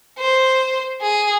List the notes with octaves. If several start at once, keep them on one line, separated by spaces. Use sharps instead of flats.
C5
G#4